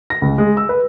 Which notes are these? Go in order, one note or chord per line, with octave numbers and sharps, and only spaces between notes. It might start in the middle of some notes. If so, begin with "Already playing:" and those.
A#6
C#2
G#3
E6
B4